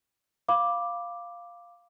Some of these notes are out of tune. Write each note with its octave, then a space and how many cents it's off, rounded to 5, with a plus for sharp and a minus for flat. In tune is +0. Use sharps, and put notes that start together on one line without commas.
F5 +0 B5 +0 D6 +0